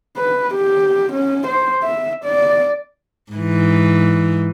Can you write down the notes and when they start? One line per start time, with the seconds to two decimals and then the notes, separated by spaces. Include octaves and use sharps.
0.17 B4
0.54 G4
1.13 C#4
1.47 C5
1.83 E5
2.25 D5
3.32 G#2 E3